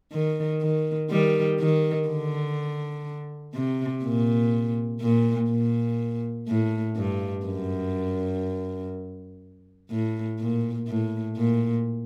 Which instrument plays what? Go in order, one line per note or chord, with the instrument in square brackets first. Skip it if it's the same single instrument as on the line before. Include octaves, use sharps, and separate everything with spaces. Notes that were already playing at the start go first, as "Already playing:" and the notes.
[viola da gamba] D#3
D#3
D#3 G3
D#3
D3
C3
A#2
A#2
A#2
A2
G2
F#2
A2
A#2
A2
A#2